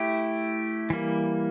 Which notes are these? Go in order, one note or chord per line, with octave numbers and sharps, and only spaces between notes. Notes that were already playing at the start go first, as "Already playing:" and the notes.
Already playing: A3 E4 G4
E3 G3 A#3